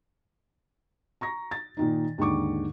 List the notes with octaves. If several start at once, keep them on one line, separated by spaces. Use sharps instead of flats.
A#5 C#6 A#6
A6
A#2 D#3 D#4
D#2 G#2 D3 C#6 D6